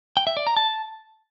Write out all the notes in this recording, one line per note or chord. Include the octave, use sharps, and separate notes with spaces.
G5
E5
D5
A#5
A5